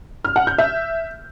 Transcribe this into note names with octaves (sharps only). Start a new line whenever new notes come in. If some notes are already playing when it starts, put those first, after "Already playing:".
F6
F#5
G6
E5